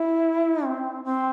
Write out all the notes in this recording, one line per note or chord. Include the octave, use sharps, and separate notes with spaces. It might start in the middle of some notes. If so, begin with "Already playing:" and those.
Already playing: E4
C4
C4